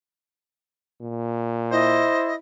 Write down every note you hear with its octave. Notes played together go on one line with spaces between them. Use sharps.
A#2
E4 C5 D#5